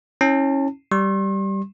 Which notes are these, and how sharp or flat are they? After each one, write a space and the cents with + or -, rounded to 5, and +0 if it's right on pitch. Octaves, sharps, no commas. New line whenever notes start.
C#4 -20 E4 -40 A5 +30
G3 -5 C6 +45